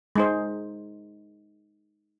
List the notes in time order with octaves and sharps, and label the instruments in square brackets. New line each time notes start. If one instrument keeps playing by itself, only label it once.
[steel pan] G#3 D#4 C5